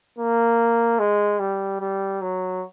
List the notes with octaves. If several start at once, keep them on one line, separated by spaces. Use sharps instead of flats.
A#3
G#3
G3
G3
F#3